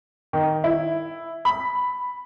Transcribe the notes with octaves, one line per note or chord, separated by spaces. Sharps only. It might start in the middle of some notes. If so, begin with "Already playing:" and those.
D#3
E4
B5